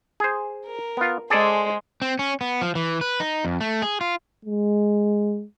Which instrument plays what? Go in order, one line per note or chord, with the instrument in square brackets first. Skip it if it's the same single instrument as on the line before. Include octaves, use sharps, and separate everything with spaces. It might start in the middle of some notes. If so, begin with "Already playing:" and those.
[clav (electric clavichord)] G#4 C5
[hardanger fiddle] A#4
[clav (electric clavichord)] B3 F4
[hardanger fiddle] G#3 C5 [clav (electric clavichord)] G#4 A4 D5
[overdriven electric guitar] C4
C#4
B3
F3
E3
B4
D#4
F2
A3
G#4
F4
[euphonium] G#3